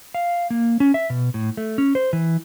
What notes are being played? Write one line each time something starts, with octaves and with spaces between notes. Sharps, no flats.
F5
A#3
C#4
E5
B2
A2
A3
C#4
C5
E3